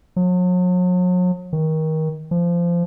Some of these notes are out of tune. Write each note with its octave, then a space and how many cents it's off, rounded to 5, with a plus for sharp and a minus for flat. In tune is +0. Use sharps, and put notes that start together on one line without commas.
F#3 -40
D#3 +25
F3 -20